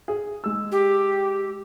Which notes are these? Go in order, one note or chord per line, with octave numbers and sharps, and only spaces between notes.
G#4
G#3 E6
G4